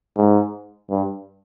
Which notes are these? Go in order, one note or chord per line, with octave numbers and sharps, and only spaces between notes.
G#2
G2